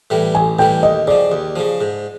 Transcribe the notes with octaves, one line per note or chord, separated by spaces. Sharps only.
A2 E3 G3
A1 G#5
A2 E3 G3 G5
D#2 D#5
C#3 F3 D5
D#2
C#3 F3
G#2